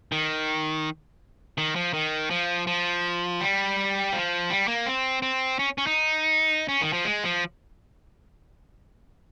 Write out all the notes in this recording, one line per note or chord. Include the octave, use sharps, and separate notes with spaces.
D#3
D#3
F3
D#3
F3
F3
G3
F3
G3
A#3
C4
C4
C#4
C#4
D#4
C#4
D#3
F3
G#3
F3